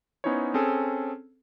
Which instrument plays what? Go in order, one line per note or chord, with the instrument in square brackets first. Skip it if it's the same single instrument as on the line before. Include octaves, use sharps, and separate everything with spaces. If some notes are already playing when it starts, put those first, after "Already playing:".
[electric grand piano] B3 C#4 D#4 E4 C5 C#5
C4 C#4 G#4 A4